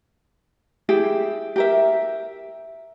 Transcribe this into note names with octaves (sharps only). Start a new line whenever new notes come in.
E4 G4 G#4
G4 A#4 E5